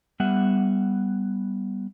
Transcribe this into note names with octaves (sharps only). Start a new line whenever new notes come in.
G3 B3 E5 F#5